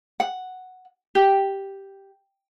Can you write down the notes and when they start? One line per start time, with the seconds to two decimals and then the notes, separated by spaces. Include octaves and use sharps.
0.20 F#5
1.15 G4